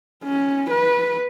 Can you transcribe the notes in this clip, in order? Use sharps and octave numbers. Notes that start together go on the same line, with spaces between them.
C#4
B4